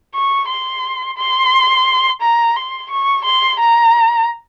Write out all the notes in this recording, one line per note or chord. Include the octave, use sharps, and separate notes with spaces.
C#6
C6
C6
A#5
C6
C#6
C6
A#5